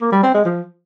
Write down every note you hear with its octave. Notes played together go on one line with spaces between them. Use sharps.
A#3
G3
C4
G#3
F3